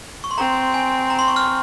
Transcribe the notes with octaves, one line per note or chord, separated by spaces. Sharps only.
C#6
C6
C4 A#5
G#5
A#5
C6
C#6
F6